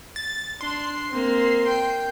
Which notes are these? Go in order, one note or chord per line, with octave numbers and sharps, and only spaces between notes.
A6
D4 C6
A#3 C4
G5